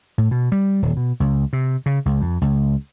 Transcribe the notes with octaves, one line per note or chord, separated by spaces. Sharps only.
A2
B2
G3
D#1
B2
C#2
C3
C#3
C#2
F2
C#2